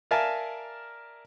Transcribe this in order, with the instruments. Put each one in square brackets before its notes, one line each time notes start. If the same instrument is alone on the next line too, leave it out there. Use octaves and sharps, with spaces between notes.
[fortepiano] A#4 D5 E5 F5 G#5 A5